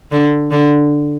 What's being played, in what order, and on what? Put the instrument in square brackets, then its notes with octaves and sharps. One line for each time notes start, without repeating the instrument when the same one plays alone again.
[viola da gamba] D3
D3